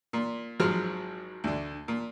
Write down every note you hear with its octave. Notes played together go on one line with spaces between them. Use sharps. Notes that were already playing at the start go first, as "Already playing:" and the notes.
A#2
G#1 F3 F#3 G#3 F6
D2 D3
A#2